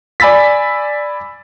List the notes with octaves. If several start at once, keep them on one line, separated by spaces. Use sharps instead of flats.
D5 G#5 B5 E6 A6 B6